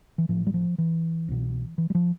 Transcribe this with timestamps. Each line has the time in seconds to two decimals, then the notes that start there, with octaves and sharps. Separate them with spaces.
0.18 E3
0.29 A1 A2 F3
0.47 G3
0.54 F3
0.78 E3
1.28 C2 B2
1.78 E3
1.90 G3
1.95 F3